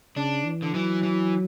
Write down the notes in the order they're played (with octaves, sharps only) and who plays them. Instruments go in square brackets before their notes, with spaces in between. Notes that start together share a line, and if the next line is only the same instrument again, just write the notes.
[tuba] C#3 [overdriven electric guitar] D4
[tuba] E3
[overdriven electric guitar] D3
[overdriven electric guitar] E3 [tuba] F#3
[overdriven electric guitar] E3